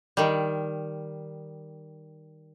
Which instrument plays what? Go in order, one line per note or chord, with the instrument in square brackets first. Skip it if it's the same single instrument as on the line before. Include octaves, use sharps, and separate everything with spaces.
[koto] D#3 G3